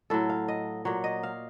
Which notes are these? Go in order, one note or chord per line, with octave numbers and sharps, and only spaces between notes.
A2 F#3 A4
F5
D#5
A#2 F#3 C#5
D#5
F5